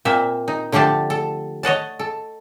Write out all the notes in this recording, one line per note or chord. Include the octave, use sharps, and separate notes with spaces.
A#2 A#3 C4 E5
D#4
D3 F3 A3 G4 A5
A4
C#5 D#5 F#5 A5
A4